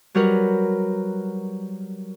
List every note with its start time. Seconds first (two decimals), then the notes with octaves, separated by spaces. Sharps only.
0.15 F#3 G3 F#4 A#4 B4